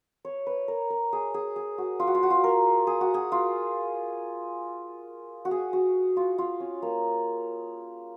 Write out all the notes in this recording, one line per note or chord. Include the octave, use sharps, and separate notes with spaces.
C#5
B4
A#4
A#4
G#4
G#4
G#4
F#4
F4
F#4
F4
F#4
F4
A#4
G#4
F#4
G#4
F4
F#4
G#4
F#4
F4
F4
C#4
A#3